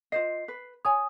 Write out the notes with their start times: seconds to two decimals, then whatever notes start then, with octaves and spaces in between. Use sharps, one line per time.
0.12 F4 C5 D#5 C7
0.48 B4
0.85 C#5 G#5 D#6